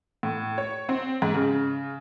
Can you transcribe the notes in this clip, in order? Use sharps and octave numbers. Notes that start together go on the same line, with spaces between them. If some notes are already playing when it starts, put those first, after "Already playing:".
A2
C#5
C4
G#2
C#3